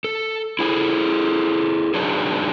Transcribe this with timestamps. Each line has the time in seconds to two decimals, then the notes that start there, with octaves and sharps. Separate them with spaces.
0.04 A4
0.59 E4 G#4 A4
1.94 F#3 D4 D#4 G#4